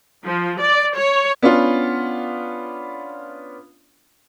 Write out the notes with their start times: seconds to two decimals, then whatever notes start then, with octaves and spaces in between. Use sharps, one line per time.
0.25 F3
0.61 D5
0.97 C#5
1.43 B3 C#4 D4 F4